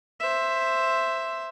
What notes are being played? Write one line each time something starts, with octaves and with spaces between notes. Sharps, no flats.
C5 E5